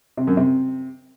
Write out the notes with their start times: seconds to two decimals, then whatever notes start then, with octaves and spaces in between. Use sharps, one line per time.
0.17 C3
0.27 F#2
0.37 C3